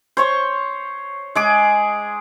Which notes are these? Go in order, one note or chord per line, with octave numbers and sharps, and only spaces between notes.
C5 C#5 C#6
G#3 G#4 D6